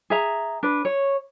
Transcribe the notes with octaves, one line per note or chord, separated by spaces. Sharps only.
G#4 E5 A#5
D4 B4
C#5